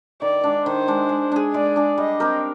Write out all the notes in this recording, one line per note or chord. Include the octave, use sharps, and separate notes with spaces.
D#3 D5
G#3 D4
D#3 C5
G#3 D4
G#3
D4 G#4
G#3 D5
D4 G#4
G3 D#5
C4 G4 A#4